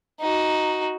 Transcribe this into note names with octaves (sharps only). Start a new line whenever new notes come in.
D#4 F#4